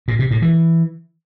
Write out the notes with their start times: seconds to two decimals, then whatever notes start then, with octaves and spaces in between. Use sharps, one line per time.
0.08 A#2
0.19 C3
0.31 A2
0.42 E3